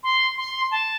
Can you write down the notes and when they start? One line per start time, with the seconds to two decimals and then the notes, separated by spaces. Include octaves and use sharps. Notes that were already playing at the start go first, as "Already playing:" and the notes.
0.03 C6
0.37 C6
0.71 A5